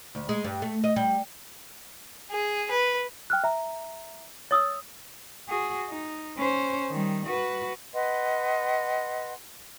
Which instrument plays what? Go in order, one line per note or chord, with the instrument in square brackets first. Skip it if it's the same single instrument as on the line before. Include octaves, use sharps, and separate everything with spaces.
[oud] D2
G#3
G2
A3
D#5
G3
[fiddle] G#4
B4
[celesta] G5 F6 F#6
E5 A#5
[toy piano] C#5 D#6 E6 [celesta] A6
[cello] F#4 G#4
D#4
C#4 C5
D#3 G3
F#4 B4
[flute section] B4 D#5 F#5 C6